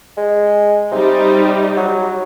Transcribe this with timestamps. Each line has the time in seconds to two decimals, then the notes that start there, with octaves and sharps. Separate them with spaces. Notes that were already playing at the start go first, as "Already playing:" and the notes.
0.17 G#3
0.92 C3 G3 D#4
1.77 F#3